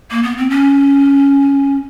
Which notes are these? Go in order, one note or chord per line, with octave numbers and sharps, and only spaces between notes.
A#3
B3
C4
C#4